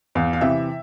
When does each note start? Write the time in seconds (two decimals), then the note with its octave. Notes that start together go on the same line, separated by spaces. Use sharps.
0.15 E2 F5
0.33 F5
0.41 C3 E3 E5